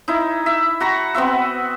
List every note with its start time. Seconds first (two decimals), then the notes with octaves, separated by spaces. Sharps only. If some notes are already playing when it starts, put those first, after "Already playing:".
0.08 D#4 E4
0.46 E5
0.80 F#4 A#5 C#6
1.15 B3 C4 F#4 E5